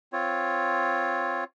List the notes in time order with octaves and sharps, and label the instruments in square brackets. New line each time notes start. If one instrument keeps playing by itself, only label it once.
[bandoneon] C4 F4 C#5